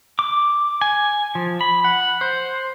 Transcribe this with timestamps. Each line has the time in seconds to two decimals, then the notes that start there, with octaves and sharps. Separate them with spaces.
0.19 D6
0.81 G#5
1.35 F3
1.61 B5
1.84 F#5
2.21 C5